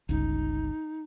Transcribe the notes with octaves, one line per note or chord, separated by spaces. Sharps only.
G1 C#2 D#4